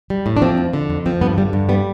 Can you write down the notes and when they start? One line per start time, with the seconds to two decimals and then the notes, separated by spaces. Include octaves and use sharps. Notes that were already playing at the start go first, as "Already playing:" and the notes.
0.10 G3
0.26 A2
0.37 D4
0.42 F3 C4
0.58 F2
0.73 D3
0.89 F2
1.06 F3 C4
1.21 G2 B3
1.37 D3 G3
1.53 G2
1.69 G3 B3